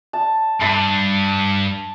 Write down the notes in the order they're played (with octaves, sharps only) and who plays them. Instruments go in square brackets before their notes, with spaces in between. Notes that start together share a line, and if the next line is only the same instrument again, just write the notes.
[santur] A5
[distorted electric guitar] G2 [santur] A5 B5